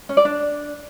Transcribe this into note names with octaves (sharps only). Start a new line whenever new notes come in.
C#4
D5
D4